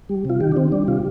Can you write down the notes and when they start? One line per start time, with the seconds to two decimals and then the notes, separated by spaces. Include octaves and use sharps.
0.09 G3
0.25 C3 F4
0.41 D#3 G4
0.52 D4
0.56 D#3 C4
0.72 G3 D4
0.88 C3 F4